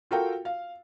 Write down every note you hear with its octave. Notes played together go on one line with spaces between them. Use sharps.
F4 F#4 A4 A#4 F5 G5
F5